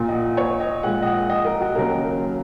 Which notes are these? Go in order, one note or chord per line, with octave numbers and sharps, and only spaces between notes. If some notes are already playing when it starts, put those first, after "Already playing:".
Already playing: A#2 A#3
D#5
F#5
C#5
D#5
A#2 G#3 F#5
D#5
F#5
D#5
A#4
F#4
D#2 C#3 F#3 A#3 A#4